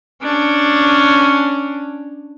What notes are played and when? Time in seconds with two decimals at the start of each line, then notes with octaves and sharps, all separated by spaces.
0.22 C#4 D4